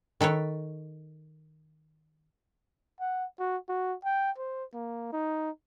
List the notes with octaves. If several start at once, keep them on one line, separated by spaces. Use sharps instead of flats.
D#3 A4 B4 C#5
F#5
F#4
F#4
G5
C5
A#3
D#4